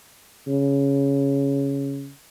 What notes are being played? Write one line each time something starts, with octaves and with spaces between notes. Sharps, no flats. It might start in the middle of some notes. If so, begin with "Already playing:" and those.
C#3